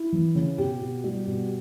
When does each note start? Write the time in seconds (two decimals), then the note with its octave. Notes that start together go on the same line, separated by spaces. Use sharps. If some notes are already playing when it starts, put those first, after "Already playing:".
Already playing: E4
0.12 E3
0.35 C#3
0.58 B2 G4
0.81 B2
1.04 G3
1.27 B2